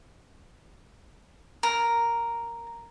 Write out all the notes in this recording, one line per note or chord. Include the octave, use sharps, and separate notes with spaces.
A#4